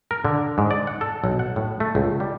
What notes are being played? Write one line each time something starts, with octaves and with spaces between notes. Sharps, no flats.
A#4
D3
G#2
D5
F#5
A4
B1
F#5
A2
A3
C#2
G3